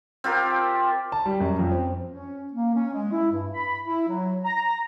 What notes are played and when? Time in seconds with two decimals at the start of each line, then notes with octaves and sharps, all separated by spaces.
0.24 C4 F4 G4 A#4
1.12 A5
1.26 G3
1.40 F#2
1.59 F2
1.71 C4
2.10 C#4
2.53 A#3
2.74 C#4
2.93 G#3
3.12 E4
3.31 G2
3.53 B5
3.86 E4
4.07 F#3
4.44 A#5